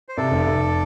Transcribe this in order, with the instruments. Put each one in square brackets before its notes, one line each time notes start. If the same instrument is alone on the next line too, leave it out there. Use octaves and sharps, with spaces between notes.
[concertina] C5
[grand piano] C3 [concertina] A4 D5
[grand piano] F1
F1